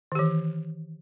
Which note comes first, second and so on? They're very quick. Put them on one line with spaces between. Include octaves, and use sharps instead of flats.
D#3 G4 E3